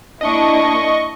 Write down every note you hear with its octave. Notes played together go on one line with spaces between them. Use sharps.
A#3 D4 E4 D#5 C#6